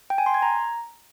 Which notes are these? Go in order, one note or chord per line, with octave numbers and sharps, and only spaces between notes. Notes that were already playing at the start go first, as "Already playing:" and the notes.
G5
G#5
C6
G#6
A#5